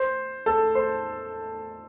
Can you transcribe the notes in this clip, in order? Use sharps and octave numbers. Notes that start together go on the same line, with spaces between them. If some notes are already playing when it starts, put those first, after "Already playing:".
Already playing: C5
A4
C5